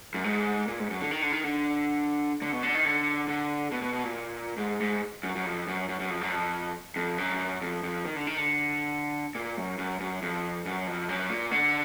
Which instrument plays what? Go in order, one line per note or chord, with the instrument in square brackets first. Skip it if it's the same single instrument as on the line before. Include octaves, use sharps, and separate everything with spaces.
[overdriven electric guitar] F#2
G#2
A#2
G#2
F#2
D3
D#3
D3
D#3
D3
D3
B2
D3
D#3
D3
D3
B2
B2
B2
A#2
G#2
G#2
F#2
F#2
F2
F#2
F#2
F#2
F2
F#2
F2
F2
F#2
F2
F2
D#3
D3
D#3
D3
A#2
F#2
F#2
F#2
F2
F#2
F2
F#2
A#2
D3